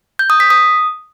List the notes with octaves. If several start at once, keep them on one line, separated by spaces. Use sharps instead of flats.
G6
D#6
B6
D#6